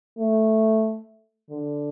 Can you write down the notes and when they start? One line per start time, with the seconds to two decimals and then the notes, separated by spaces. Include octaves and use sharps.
0.18 A3
1.50 D3